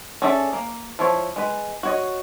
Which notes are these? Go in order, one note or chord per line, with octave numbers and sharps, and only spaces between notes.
C#4 G#4 A4 D5 E5
A#3
F3 E4 C#5
G#3 B4
F#4 C#5 D#5